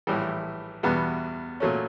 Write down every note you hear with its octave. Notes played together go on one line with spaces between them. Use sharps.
A#1 A2 E3 G3
E2 B2 G3 B3
A#2 F#3 A3 C#4